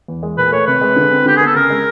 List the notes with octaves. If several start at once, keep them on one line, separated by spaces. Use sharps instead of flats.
E2
G#3
A#2 B4
A3 C#5
C3 B4
G#3
D3
C4
D3 G4
G#4
B3
A4
C#3 A#4
G#3